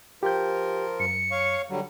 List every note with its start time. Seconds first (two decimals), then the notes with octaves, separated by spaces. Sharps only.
0.23 F3 F4 G4 A#4 G6
1.00 F#2 C#7
1.31 C#5 F5 C#6
1.69 D3 F#3 G3